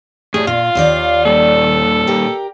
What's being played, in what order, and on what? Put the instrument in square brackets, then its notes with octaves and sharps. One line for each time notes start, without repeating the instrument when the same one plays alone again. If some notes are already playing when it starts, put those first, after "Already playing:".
[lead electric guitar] A2 [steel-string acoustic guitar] G3 [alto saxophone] G#4
[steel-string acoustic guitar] A#2 [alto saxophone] F4 [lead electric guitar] F5
[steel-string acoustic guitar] D#2 D#3 D5
[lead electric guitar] A#2 G3 [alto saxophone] A4
[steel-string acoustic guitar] G4 A#4 G5